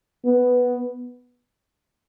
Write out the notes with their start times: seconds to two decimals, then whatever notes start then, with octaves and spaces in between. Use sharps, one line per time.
0.25 B3